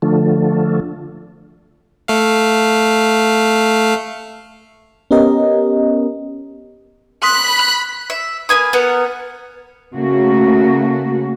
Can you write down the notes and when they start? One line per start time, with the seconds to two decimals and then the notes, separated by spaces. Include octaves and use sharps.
0.02 D3 F3 A3
2.08 A3 F5
5.11 B3 C#4 G4 A#4 D#5
7.23 B5 C6 D#6 F#6 B6
8.10 E5
8.49 A#3 B4 G#5 D#6
8.73 B3 A#4 F#5
9.94 C#3 A3 A#3 F#4